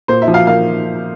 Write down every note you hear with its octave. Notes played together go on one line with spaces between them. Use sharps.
A#2 C5
E5
F3
F5
A#3 F5